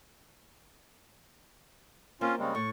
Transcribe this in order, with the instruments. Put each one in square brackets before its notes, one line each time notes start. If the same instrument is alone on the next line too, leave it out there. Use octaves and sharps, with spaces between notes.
[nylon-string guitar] A#3 C4 [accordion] C#4 F4
[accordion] C#3 G3 G#3
[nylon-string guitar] A2 [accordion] C#6